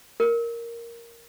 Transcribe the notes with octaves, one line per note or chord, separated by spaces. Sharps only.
A#4